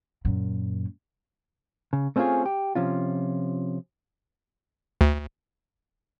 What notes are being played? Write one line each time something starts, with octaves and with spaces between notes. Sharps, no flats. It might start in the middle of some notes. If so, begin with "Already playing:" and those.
F#2 A#2
C#3
A3 C4 C#4 E4 F4 G#4
G4
C3 F3 C#4 F4
D2